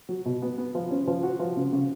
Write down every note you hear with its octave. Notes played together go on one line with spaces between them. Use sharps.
F#3
B2
B3
B3
F3
C#4
F3
F#4
F3
C#3
C#3